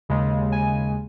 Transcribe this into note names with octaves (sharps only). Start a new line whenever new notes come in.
D#2 C#3 G#3
G#5